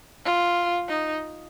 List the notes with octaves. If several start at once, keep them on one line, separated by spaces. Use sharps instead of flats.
F4
D#4